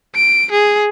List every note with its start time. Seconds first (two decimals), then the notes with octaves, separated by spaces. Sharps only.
0.15 D7
0.51 G#4